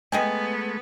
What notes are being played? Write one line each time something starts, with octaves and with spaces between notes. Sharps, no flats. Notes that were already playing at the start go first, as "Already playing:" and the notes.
G#3 A3 B3 D#5 G5 G#5